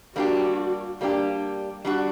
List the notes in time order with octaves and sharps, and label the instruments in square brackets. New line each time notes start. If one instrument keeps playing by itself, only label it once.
[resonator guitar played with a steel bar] G3 A#3 D4 G4 [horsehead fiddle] F#4
[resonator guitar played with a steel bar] G3 A#3 D4 G4
G3 D4 F#4